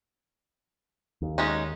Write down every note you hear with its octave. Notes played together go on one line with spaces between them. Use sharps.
D#2
G#3 C#4 D#4